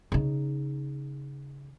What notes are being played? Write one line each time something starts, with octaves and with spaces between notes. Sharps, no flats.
C#3 D#4